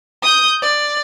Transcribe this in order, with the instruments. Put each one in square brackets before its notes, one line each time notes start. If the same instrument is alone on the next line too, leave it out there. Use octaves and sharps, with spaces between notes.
[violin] D#6 G6
D5